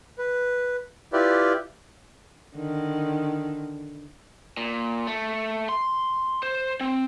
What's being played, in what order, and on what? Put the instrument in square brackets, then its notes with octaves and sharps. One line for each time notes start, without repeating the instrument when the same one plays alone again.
[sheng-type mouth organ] B4
E4 F4 G4 B4 D5
[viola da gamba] D3 D#3
[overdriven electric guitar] A#2
A3
C6
C5
C4